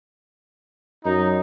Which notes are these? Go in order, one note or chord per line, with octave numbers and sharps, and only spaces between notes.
F#2 D#4